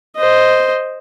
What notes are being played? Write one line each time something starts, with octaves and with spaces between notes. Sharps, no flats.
C5 D#5